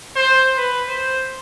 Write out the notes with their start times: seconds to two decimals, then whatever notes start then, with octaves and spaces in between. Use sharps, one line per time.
0.16 C5
0.57 B4
0.88 C5